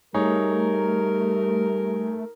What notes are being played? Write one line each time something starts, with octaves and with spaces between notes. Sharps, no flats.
G3 A3 D#4 G#4 A#4 C#5